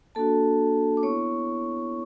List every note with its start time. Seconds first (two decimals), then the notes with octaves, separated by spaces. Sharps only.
0.15 A#3 D4 F#4 A4 A5
0.97 D6
1.03 B3 E4 C#5 C#6